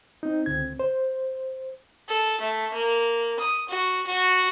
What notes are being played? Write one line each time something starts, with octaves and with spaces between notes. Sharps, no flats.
C4 D#4
C#2 D3 C4 G#6
C5
A4
A3
A#3
D#6
F#4
F#4